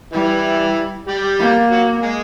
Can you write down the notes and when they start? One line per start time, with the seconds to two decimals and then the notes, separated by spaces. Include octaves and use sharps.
0.13 E3 G3 E4
1.08 G3 G4
1.39 A#3
1.71 F#3 F#4
2.03 G#3 G#4